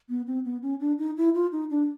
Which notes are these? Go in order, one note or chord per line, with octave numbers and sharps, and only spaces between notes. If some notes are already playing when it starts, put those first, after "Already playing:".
B3
C4
B3
C#4
D4
D#4
E4
F4
D#4
D4